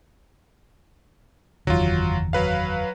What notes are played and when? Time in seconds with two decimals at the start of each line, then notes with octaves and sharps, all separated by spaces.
1.67 F#1 E2 D#3 F#3 F4
2.33 F#3 B4 F5